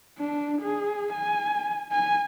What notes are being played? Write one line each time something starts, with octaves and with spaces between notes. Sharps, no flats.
D4
G#4
G#5
G#5